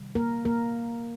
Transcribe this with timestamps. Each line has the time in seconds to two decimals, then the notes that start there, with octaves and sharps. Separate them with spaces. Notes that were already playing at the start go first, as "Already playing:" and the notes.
Already playing: C3 D#3 G3
0.15 A#3 A#4
0.45 A#3 A#4